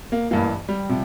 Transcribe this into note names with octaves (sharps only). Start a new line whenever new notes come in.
A#3
A1 G2 E3 A#3
G3
C3 F3